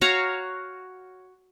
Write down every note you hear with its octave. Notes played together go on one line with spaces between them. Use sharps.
F#4 C#5 F5 A#5